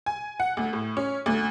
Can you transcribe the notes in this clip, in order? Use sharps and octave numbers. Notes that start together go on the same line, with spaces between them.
G#5
F#5
D2
A2
C#4
D2